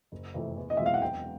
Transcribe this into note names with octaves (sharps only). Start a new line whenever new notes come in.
F#1
F2 C3 E3 A3
E2
D#5
B2 G#3 C4 F4 E5
F5
F#5
E1 G5